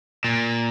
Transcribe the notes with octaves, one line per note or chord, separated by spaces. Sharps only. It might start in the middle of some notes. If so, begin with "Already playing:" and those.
A#2